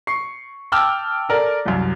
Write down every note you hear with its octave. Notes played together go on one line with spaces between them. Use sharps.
C#6 C7
G5 A5 D6 E6 F6
A4 A#4 D5
C2 F#2